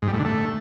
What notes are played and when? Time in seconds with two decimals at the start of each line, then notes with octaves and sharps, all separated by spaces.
0.02 G#2
0.08 G3
0.14 A2
0.19 D3
0.25 A3